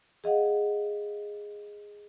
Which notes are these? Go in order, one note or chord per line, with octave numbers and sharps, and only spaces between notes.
G#4 D#5 F5 F#5